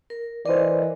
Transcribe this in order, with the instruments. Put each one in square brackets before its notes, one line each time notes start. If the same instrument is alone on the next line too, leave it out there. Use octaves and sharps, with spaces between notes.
[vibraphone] A#4
[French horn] E3 [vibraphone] A#4 D#5 [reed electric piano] C5 D5